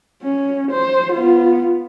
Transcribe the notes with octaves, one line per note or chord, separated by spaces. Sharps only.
C#4
C5
B3 F4